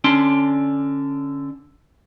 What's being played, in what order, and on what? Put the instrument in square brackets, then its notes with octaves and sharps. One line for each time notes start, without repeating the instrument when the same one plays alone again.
[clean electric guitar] D3 C#4 D4 C6